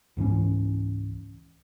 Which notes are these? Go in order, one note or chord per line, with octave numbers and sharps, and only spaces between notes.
C#2 G#2 E3 C#4